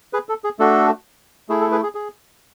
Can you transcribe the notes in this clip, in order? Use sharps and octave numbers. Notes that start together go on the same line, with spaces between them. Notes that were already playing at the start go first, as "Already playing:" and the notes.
G#4 B4
A4
G#4
A3 D4 F#4 A4
A3 E4 G#4
A4
G#4 B4
G#4
G#4